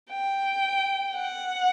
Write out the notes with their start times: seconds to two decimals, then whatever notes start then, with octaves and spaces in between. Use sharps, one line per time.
0.10 G5
1.15 F#5